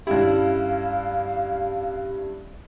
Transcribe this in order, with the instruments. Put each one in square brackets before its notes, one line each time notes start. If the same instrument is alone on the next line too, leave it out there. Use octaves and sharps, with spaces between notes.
[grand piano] G2 E4 [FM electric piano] C#4 G4 [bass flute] F5